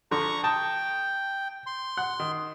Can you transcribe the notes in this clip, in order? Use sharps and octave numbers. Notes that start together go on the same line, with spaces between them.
D3 F3 A#5 C#6
G5 A5 D#6
C6
F#5 F#6
D#3